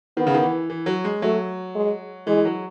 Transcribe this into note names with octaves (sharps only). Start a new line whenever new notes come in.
D#3 B3
C#3
D#3
E3
E3
F#3
G#3
F#3 A3
G#3
E3 G#3
F#3